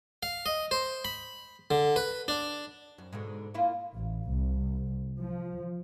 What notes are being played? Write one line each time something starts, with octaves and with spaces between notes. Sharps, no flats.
F5
D#5
C5
B5
D3
B4
D4
F#2
G#2 B2 D3
A#3 E4 F4
A1
C2
F3